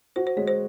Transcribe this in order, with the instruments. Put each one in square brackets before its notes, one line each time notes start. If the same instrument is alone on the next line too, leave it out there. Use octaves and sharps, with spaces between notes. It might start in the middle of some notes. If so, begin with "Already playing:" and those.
[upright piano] F#4 [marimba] C5
[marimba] C5
[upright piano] G#3 [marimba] C#5
[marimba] C5